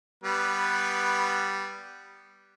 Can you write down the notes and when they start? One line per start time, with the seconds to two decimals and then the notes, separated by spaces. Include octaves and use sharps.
0.24 G3 B3 B4